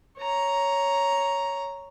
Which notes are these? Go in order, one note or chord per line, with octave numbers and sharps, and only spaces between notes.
C#5 A#5